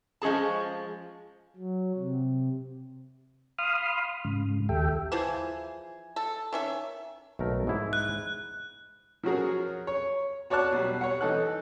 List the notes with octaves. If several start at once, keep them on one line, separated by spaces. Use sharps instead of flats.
F3 G#3 C#4 G#4 A5
F#3
C3
F5 B5 C6 D#6 F6
G#2 C#3
D#2 G4 A4 E5 G5
E3 F3 E4 G#4
A4
D#3 C#4 E5
B1 A3 A#4
G#2 E4
F#6
F3 F#3 C#4 F#4 G#4 A#4
C#5
F#4 C#5 D5 A5 F#6
B2 F#3 G3
C#5 F#5
E3 D#4 A4 F#6